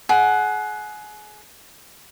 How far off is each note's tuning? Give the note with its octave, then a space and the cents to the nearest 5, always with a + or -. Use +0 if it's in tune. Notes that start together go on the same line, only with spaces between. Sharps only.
G#4 +30 F#5 +0